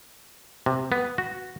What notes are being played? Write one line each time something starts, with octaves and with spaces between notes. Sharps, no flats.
C3
B3
F#4